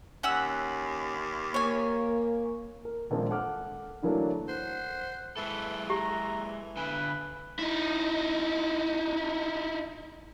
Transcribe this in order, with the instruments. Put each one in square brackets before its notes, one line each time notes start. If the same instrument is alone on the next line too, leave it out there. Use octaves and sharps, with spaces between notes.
[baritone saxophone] D#2 [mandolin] C#4 F#5 E6
[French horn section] A#3 [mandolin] C#5 G#5
[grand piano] A#4
D#1 A#1 G#3 A#3 C4 D4
A4 F#5 D6 F6
D3 E3 F#3 A3 A#3 D4
[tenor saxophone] C5 [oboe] F#5
[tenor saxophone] E3 [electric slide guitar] G#3 A4 [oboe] B4
[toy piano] G4 [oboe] A#5
[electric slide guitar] D3 G#5 [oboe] B4
[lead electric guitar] D#4 E4